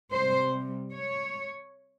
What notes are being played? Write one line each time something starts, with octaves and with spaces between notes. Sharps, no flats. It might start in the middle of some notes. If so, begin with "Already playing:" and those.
C3 G3 C5
C#5